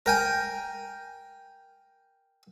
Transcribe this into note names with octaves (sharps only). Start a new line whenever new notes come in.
A#4 G5 G#5